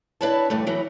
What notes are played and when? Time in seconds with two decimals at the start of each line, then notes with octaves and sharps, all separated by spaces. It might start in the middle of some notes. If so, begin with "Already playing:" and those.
0.21 D4 E4 B4 C#5 A5
0.50 E2 G2 D3 A3
0.67 E3 F#3 B3